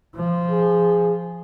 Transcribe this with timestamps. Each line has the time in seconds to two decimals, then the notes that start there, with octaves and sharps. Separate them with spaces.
0.15 F3
0.51 G#4